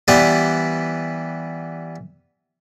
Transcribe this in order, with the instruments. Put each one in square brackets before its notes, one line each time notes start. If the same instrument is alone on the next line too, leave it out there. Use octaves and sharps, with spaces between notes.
[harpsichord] E3 G3 B3 B4 C5 D5